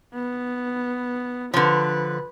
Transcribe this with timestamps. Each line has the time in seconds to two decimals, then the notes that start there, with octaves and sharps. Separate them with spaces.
0.14 B3
1.54 D3 F3 B4